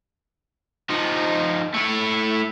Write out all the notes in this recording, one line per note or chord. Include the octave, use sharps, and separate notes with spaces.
F3 D#4
A3 E4